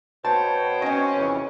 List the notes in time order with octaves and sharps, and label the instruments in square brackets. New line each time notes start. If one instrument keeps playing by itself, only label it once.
[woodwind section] B2 [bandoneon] C5 C#5 G5 [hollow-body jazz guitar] A5
[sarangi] C#4 [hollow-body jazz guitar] D#5 G#5
[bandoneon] F2 C#3 E3